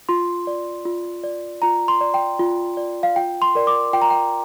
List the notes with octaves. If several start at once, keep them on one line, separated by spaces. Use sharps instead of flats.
F4 C6
D5
F4
D5
F4 A#5
C6
D5
G5
F4
D5
F5
F4 G5
C6
A#4 D5
D6
F4 G5
A#5
G5